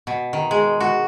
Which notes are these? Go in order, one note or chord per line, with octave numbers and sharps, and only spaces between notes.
B2
D#3
G#3
F#4